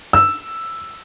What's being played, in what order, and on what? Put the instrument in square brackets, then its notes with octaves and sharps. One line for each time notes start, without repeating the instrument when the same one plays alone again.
[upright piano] E6